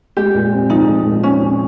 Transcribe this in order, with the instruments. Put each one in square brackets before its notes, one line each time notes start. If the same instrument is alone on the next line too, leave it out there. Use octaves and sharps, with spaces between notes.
[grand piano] G#3 [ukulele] G4
[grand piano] A#2
C4
[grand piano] F3 [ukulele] D#4
[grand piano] G#3
A#2
[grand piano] C4 [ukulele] C#4
[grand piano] F3